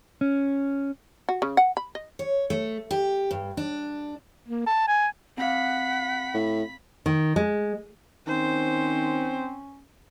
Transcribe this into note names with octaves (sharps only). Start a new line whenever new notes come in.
C#4
F#4
C#3
F#5
B5
D#5
C#5
A3
G4
G2
D4
A#3
A5
G#5
C4 F5 F#5 B5 B6
A2
D#3
G#3
D#3 C4 C#4 C5